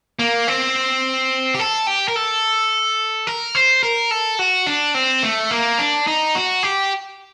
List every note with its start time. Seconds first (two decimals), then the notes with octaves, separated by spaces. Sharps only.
0.19 A#3
0.48 C4
1.55 G4
1.59 A4
1.87 G4
2.08 A#4
2.16 A4
3.27 A#4
3.55 C5
3.83 A#4
4.11 A4
4.39 F#4
4.67 D4
4.94 C4
5.23 A3
5.51 A#3
5.78 D4
6.07 D#4
6.35 F#4
6.63 G4